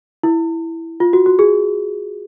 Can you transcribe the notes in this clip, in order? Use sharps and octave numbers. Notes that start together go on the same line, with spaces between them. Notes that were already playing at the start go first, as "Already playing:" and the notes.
E4
F4
F#4
F#4
G#4